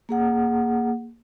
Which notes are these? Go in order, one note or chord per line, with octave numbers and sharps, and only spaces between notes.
A#3 G#4 F#5